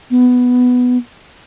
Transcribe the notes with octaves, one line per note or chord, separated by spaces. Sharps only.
B3